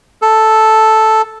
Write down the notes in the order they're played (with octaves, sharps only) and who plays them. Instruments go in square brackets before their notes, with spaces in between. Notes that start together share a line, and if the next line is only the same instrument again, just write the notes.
[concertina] A4